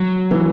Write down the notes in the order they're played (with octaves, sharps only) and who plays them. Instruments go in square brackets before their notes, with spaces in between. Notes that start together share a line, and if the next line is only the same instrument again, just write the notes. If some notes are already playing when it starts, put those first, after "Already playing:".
Already playing: [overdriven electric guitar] F#3
[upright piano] E3